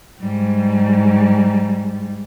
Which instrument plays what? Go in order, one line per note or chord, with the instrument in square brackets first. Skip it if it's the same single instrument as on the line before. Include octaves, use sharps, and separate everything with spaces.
[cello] G#2 G3